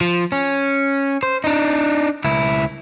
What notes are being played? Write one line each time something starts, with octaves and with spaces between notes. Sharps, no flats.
F3
C#4
C5
D4 D#4
C#2 E4